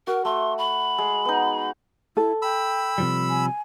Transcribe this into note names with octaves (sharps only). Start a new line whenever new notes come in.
F#4 A#4
A3 C6
B5
G#3
B3 D#4
E4 A4
G5 B5 E6
C3 F3 G3
G#5